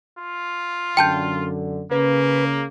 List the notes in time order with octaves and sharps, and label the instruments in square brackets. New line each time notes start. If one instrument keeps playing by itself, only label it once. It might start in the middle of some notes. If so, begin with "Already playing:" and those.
[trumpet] F4
[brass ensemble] F#2 D3 [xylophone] G5 A5 G6
[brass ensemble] C#3 [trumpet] A#3 [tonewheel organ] B4